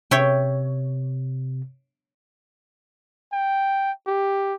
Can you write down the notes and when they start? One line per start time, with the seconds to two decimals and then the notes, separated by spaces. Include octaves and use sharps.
0.11 C3 C#5 E5 G5
3.33 G5
4.07 G4